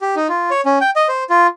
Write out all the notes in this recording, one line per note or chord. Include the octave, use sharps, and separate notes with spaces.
G4
D#4
F4
C#5
C#4
G5
D#5
C5
F4